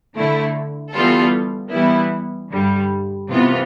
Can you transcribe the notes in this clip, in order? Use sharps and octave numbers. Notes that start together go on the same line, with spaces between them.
D3 A3 E4
E3 G3 B3 F4 A4
E3 G3 B3 E4
G2 D3 G3
C3 E3 B3 F4